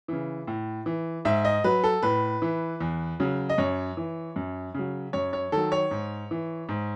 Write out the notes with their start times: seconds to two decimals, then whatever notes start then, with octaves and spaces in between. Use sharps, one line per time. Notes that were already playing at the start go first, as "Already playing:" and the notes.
0.08 C#3 E3
0.47 A2
0.86 E3
1.25 G#2 E5
1.45 D#5
1.64 F#3 B4
1.84 A4
2.02 A2 B4
2.42 E3
2.81 E2
3.20 C#3 F#3
3.49 D#5
3.58 F#2 C#5
3.97 E3
4.36 F#2
4.74 C#3 F#3
5.13 F#2 C#5
5.33 C#5
5.52 D#3 F#3 A4
5.72 C#5
5.91 G#2
6.31 E3
6.69 G#2